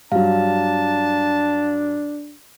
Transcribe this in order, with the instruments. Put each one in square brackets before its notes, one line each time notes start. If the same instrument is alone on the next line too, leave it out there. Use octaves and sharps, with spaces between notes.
[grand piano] G2 F#3 [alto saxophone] D4 [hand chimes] F5 [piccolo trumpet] A5